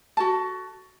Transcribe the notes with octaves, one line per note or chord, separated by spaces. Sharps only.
F#4 A4 A5